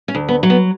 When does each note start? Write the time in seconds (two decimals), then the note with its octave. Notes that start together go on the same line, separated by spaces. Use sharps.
0.08 C#4
0.15 D2
0.29 B3
0.43 F#3
0.50 B3